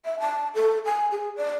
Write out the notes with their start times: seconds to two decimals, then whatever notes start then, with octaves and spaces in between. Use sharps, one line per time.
0.05 E5
0.20 A5
0.55 A4
0.85 G#5
1.11 G#4
1.37 D5